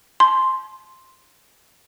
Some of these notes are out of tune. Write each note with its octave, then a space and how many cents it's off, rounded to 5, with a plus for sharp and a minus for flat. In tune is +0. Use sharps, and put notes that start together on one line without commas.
A5 -45 C6 +0